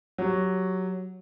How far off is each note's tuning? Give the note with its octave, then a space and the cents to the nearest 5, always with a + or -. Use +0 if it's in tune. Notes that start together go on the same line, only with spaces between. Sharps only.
F#3 +0 G4 +0